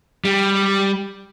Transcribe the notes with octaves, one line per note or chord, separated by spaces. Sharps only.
G3